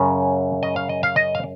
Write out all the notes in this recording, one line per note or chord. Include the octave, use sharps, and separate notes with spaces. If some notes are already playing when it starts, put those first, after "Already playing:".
Already playing: F#2 C#3 C#5
D#5
F5
D#5
F5
D#5
F5